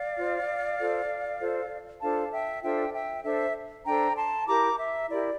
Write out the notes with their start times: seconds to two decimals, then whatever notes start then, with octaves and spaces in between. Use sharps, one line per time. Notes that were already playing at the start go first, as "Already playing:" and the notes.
Already playing: D5 F5
0.17 F4 C5
0.78 F4 A4 C5
1.39 F4 A4 C5
2.01 D4 F4 A4 C5 F5 A5
2.32 E5 G5
2.63 D4 F4 A4 C5 E5 G5
2.93 E5 G5
3.24 D4 A4 C5 E5
3.85 D4 A4 C5 G5 A#5
4.17 A5 C6
4.47 E4 G4 A#4 A#5 D6
4.78 E5
5.08 E4 G4 A#4 D5